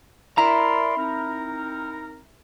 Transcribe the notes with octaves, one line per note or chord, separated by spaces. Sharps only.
E4 A#4 D5 A#5 C6
C4 D#4 A#4